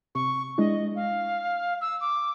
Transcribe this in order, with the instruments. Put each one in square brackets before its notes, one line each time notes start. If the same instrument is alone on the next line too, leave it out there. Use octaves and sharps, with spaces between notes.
[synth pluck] C3 [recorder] C#6
[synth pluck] G#3 D4 E4 [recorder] D#5
[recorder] F5
E6
D6